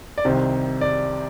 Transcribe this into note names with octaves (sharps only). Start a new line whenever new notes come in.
D5
C2 C3 D#3 C5
D5